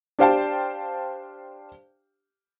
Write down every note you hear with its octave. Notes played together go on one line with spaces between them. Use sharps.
D4 G4 C5 F5 G5 A5